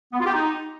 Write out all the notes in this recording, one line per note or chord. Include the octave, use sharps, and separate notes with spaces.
B3
F4
G4
D#4